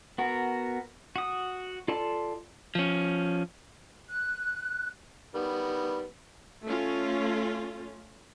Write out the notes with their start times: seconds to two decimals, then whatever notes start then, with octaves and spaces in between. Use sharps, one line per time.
0.18 B3 F#4 A#4
1.16 F#4 D#6
1.88 F4 A4 D5 A5 C6
2.75 F3 C#4
4.09 F#6
5.35 D#3 G3 B3
6.64 A3 C#4 F4